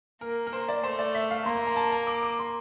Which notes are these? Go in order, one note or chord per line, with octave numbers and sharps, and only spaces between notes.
A#3 A#4
A#4
C5
D5
A3 C5
D5
E5
F5
A#3 C6
C6
A#5
A5
A#5
D6
D6
C6